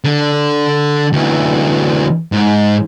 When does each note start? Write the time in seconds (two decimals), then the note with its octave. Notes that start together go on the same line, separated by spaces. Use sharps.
0.04 D3
1.13 D2 E3
2.32 G#2